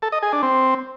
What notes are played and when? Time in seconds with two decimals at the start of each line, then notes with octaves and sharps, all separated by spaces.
0.02 A4
0.12 D#5
0.22 G#4
0.33 D4
0.43 C4